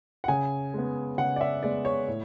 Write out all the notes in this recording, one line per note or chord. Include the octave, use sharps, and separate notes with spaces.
F#5
C#3 G#5
G#3 B3
C#3 F#5
D5
E5
G#3 B3 D5
C#5
A2